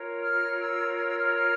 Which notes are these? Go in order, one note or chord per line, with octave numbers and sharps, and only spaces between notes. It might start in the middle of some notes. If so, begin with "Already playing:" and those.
Already playing: F4 A#4 C#5
F6
E6
F6
E6
F6
F6